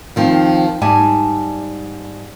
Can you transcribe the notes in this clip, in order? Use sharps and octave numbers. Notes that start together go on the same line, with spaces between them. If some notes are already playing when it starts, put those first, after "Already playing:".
D#3 F3 C4
G#2 G3 D5 G#5 A5